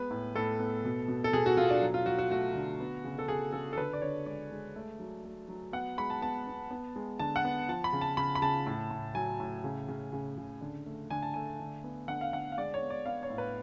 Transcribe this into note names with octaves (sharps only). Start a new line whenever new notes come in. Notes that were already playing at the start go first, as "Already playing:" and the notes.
Already playing: G#3 B3 B4
A2
A2 A4
B3
B2
B2
A4
B2 G#4
F#4
B2 F4
D4
F#3
F4
F#3 F#4
F#4
A3 F#4
D3
B3
C#3
A4
C#3 G#4
C#3 A4
A4
D3 B4
D5
D3 C#5
G#3 D5
G#3
A3
F#3
A3
F#3
B3 F#5
G#3 B5
A5
B3 A5
B3
B3
G#3
D3 A5
F#5
B3
F3 A5
B5
C#3
A5
C#3 B5
B5
C#3 A5
A2
A2
F#3 G#5
A2
C#3
C#3
C#3
C#3
D3
A3
D3 G#5
A5
A3 G#5
D3
B3
D3 F#5
F5
D3 F#5
F5
G#3 D5
C#5
B3
D5
B3 F5
C#5
A2
B4